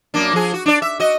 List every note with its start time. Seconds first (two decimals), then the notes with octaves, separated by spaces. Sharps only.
0.14 F#2 A#3 D4
0.33 F3 G#4
0.54 F#4
0.66 D4 D5
0.82 E5
0.99 F#4 D#5